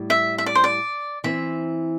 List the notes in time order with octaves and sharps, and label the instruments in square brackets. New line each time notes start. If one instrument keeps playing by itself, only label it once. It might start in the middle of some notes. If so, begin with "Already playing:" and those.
Already playing: [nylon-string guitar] A2 G3
[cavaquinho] E5
E5
D5
C5
D5
[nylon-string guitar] E3 C4 E4 C5 [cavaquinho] E5